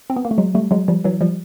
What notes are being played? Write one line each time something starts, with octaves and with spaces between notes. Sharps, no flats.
C4
B3
A#3
A3
F#3 G#3
G3 A3
F#3 G#3
F3 G3
E3 F#3
F3 G3